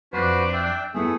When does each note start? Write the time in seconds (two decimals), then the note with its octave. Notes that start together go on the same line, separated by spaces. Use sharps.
0.13 F2 D4 F#4 B4 C5
0.53 E5 G5
0.94 A3 B3 E4 G#4 F#5